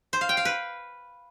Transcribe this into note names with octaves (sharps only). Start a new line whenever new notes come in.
C5
F5
G5
F5
B4